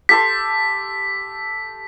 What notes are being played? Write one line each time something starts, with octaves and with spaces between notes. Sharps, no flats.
G4 A4 C6 B6